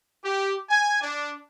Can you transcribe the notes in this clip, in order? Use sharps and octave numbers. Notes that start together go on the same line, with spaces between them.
G4
G#5
D4